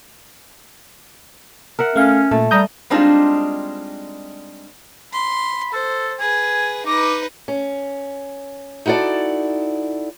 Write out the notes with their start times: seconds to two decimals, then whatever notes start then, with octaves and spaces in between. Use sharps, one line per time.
1.79 A#4 E5 F#5
1.96 A3 C#4 F5
2.31 A#2 A3
2.51 G3 A#5 D#6 G6
2.90 G3 G#3 C4 D4 D#4 F4
5.13 B5 C6
5.73 A4 C5
6.20 G#4 B4 G#5
6.86 D#4 B4 D6
7.48 C#4
8.86 D#4 E4 F#4 A4 D5